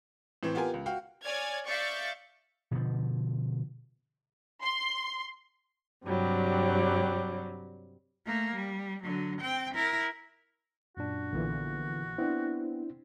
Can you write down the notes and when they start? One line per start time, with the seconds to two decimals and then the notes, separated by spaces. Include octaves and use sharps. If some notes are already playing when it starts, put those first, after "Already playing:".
0.43 A2 E3 C4
0.55 B3 F4 G4 A#4 G#5
0.74 C#2
0.86 F#4 F5 G5
1.23 C#5 D5 G#5 F6 G#6
1.66 D5 E5 F5 C#6 G6 A6
2.71 B2 D3 F3
4.63 C6
6.06 G2 C3 F#3 G3
8.26 A3 A#3
8.55 G3
9.03 D3 F#3
9.41 C4 G5
9.74 E4 A#4
10.97 F#2 A#2 D4 F#4
11.33 A#1 A#2 D3 E3 B3
12.18 B3 C4 D4 E4